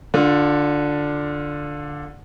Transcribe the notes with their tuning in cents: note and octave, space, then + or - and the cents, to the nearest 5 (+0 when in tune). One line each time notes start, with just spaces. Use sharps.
D3 +0 D4 +0 F4 +20